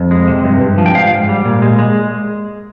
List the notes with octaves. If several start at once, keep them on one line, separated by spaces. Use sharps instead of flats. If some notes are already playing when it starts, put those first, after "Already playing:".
Already playing: F2
G#3
C3
G2
G2
F3
G5
G#2 F5
G#2
G3
A#2
G#3
G#3